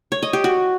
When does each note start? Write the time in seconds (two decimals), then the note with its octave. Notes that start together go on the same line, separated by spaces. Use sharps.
0.12 C#5
0.23 D#5
0.33 G4
0.44 F#4